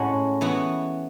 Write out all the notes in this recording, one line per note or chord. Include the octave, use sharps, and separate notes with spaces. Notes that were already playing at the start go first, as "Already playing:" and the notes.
Already playing: A2 G#3 C#4 F#4
E3 B3 F#4